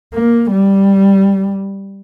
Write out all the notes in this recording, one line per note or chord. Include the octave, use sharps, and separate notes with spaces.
A#3
G3